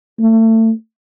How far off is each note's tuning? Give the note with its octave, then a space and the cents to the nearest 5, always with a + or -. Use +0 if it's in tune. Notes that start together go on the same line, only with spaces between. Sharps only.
A3 +30